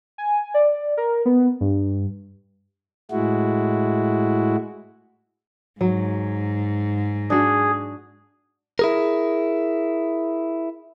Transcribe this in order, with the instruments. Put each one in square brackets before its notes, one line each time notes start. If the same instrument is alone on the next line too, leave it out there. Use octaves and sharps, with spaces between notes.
[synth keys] G#5
D5
A#4
B3
G2
[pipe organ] A2 G#3 E4 F#4
[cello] G#2 [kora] F#3
[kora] D4 F#4 [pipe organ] G#4
[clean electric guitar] E4 G#4 A#4